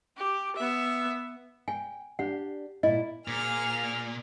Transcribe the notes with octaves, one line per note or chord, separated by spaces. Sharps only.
G4
B3 E5
G5 G#5
D4 G4 F#5
A#2 E4 D#5
A#2 G#4 F6